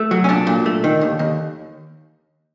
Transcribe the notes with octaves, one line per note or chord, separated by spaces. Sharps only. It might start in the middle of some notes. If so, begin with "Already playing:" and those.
Already playing: A3
F#3
C#4
A#2 D4
A#2
A3
D#3
D#2
D#2